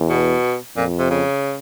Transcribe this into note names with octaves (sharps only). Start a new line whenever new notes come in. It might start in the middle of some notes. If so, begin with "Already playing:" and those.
Already playing: E2
B2
F2 A#2
C3
C#3